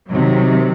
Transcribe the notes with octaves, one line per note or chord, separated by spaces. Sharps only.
C3 D#3 F#3